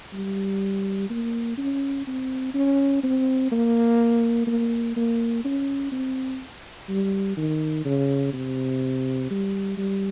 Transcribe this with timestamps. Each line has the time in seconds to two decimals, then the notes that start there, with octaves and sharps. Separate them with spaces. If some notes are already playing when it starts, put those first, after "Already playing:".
0.13 G3
1.10 A#3
1.58 C#4
2.07 C4
2.54 C#4
3.03 C4
3.52 A#3
4.47 A#3
4.97 A#3
5.45 C#4
5.92 C4
6.89 G3
7.37 D#3
7.85 C#3
8.33 C3
9.31 G3
9.78 G3